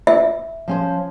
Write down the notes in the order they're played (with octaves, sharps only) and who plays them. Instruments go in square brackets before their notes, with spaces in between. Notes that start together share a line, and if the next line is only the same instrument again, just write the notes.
[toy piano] E5
[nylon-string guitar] F3 C#4 C5